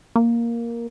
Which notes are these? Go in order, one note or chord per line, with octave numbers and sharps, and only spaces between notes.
A#3